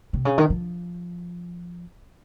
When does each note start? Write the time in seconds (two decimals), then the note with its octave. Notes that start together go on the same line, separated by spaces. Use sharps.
0.13 C3
0.25 C#3
0.38 D#3
0.50 F3